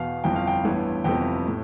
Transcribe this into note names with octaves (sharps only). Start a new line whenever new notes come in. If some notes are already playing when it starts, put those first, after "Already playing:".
Already playing: E2 B2 B3 F5
G1 F2 E3 G5
F5
G5
A1 G2 E3 B3
G1 F2 C3 E3 B3 G5
A2